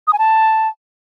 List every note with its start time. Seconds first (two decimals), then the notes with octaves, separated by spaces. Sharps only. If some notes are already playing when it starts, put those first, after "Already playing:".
0.07 D#6
0.13 G#5
0.19 A5